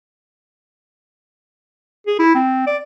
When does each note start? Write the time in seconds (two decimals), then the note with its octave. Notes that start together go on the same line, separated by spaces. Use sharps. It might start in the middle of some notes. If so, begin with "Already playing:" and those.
2.07 G#4
2.19 E4
2.35 C4
2.67 D5